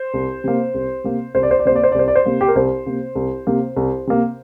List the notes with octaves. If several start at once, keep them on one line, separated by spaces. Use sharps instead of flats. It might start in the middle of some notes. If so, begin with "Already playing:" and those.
Already playing: C5
C2
C3 A#3
C2
C3 A#3
C2 C5
D5
C5
D5
C3 A#3 C5
D5
C5
D5
C2 C5
D5
C5
C3 A#3
G4
A#4
C2 C5
C3 A#3
C2
C3 A#3
C2
C3 A#3